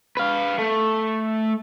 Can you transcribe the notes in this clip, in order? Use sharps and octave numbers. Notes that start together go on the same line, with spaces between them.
B4 F5
A3